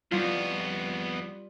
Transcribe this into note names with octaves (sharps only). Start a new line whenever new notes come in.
F2 G3 B3 F4